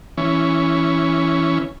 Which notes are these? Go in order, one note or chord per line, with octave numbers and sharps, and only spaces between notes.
E3 C#4